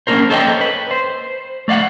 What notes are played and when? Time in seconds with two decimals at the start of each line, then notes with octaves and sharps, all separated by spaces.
0.07 A#3 C#4 D4 F4 A#4 C5
0.30 A4 C5 C#5 D#5 F5 G5
0.61 B4
0.91 C5
1.68 A3 D5 F5 F#5